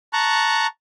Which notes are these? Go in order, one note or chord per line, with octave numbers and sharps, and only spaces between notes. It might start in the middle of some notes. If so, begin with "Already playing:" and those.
A5 A#5 C#6 F#6